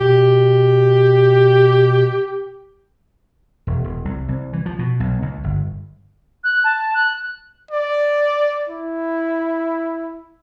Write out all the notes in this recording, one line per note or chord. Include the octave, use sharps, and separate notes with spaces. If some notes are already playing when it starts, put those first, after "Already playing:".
B2 G4
E1
E1
C2
C2
E3
F3
B2
B1
C#2
G1
F#6
A5
F#6
D5
E4